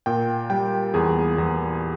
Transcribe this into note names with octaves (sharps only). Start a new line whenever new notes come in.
A#2 G5
G3 G5
E2 G#4
E2